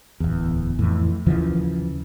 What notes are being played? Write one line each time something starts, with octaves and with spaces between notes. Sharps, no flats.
D1 E2
F2 A2 E3
D#2 C#3 E3 F3